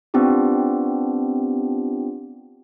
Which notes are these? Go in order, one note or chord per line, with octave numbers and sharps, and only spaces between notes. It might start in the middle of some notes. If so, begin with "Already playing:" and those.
B3 C4 D4 F4 G4